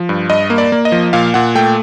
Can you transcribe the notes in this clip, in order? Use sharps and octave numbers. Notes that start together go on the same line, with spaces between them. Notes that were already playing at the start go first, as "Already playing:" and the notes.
Already playing: F3
G2
G2 D#5
A#3
D5
A#3
D#5
F3
A#2 F5
A#2 F#5
A3 G5